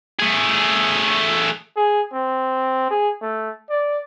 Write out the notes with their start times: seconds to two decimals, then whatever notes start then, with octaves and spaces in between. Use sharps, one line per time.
0.20 A3 G#4
1.77 G#4
2.13 C4
2.91 G#4
3.22 A3
3.70 D5